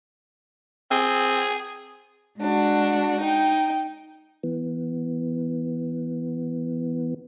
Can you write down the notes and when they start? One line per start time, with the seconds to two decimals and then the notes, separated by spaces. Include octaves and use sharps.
0.91 C4 G#4
2.38 G#3 D4 F#4
3.20 D#4 G5
4.43 E3 B3